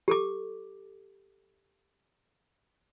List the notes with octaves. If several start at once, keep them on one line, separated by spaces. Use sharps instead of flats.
G4 A4 D6